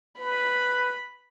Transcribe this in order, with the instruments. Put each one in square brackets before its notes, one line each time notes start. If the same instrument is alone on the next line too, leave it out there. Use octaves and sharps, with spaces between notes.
[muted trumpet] B4 [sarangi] B5